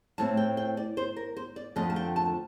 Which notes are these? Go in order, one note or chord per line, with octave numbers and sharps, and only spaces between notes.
A2 A3 C4 A5
G5
G5
D5
C5
A#4
C5
D5
F2 D3 F3 A3 D#5
A5
G5
A5